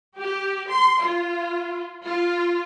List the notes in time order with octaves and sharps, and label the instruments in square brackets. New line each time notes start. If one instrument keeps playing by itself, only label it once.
[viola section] G4
C6
F4
F4